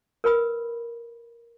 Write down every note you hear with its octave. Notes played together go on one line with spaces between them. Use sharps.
A#4 B4 B5 D#6